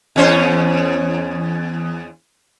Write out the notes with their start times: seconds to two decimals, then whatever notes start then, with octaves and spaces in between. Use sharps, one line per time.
0.16 E2 C#4 C5